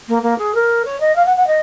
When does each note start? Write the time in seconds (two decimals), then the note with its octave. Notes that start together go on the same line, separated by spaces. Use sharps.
0.08 A#3
0.22 A#3
0.38 G#4
0.54 A#4
0.85 C#5
1.00 D#5
1.16 F5
1.26 F#5
1.36 F#5
1.47 D#5